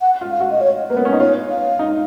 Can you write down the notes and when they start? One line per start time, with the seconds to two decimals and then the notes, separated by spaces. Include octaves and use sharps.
0.01 F#5
0.21 F4
0.31 F5
0.40 F#4
0.51 D#5
0.61 C#5
0.90 A#3 B4
0.97 B3
1.05 C#4
1.13 D#4
1.20 F4 C#5
1.50 F5
1.79 D#4